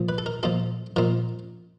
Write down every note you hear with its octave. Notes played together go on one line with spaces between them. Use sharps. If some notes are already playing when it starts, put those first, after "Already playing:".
Already playing: A#2 F3
B4
A4
A#4
A#2 F3 A4
A#2 F3 A#4